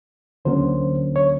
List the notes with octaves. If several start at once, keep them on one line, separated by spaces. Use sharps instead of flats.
D2 D3 F#3 A#3 C#4 C5
C#5